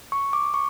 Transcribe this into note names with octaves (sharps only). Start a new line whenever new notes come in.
C#6
D6
C#6